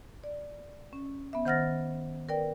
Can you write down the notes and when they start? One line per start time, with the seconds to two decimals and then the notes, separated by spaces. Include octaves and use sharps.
0.24 D5
0.93 C#4
1.33 B3 E5
1.45 D#3 C5 F#5 F6 A6 A#6
2.29 A#4 B4 D5 G5